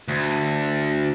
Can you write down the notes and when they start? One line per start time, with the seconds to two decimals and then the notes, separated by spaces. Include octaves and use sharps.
0.08 D2